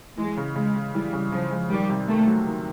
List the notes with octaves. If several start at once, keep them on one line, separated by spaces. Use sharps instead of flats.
E3 G#3
C#3
C#3 G#3
G#3
E3 G3
C#3
C#3 F3
G#3
D#3 G3
C3
A3 A#3
F#3
D#3